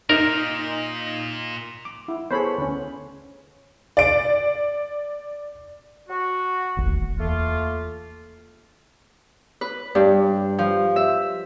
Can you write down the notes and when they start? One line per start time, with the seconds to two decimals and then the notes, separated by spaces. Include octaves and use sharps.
0.09 A#2 D#4 A#4
1.85 D6
2.08 E4
2.31 B3 G#4 A4 C5 C#5 B5
2.58 D2 C#4
3.97 D5 D7
6.09 F#4
6.77 D#1 G#1 D2
7.18 E2 A3 A#3 F4
9.61 B4
9.95 G2
10.59 F3
10.96 E5